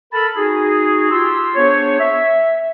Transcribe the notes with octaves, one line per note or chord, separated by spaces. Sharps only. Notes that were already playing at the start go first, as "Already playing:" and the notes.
A4 A#4 A5 B5
D#4 F#4 G#4
F4 G4 C6 E6
B3 D4 G#4 C5 C#5
E5